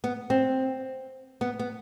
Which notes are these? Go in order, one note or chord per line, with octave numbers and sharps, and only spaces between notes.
B3
C4
B3
B3